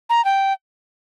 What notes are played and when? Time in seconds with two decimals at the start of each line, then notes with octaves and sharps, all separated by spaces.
0.10 A#5
0.25 G5